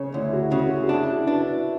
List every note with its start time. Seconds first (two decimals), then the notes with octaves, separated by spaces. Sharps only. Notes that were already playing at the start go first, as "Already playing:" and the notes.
Already playing: C#3 C#5
0.14 D2 E4
0.33 F#4
0.51 C#3 F#4
0.71 F#4
0.84 F#4
0.89 D4 E4
1.08 F#4
1.27 D4 B4
1.46 E4